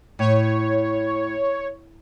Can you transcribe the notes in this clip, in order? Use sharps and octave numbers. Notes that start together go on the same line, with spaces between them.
A2 C#5